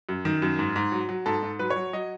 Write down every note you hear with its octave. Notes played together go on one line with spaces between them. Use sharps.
F#2
D#3
F#2
G#2
G#2
F#3
F#3
G#2 A4
G#2
F#3 B4
C#5
F#3
F#3 D#5